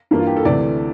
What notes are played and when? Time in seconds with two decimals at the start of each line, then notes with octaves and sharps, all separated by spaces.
0.11 G2 E3 A#3
0.19 F4
0.27 G4
0.37 A4
0.45 D2 C3 E3 A3 D5